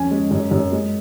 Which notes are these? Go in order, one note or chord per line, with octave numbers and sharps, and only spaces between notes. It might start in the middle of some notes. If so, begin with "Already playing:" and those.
Already playing: F2 C#4 G#5
G#3
F#2
F#2
G#3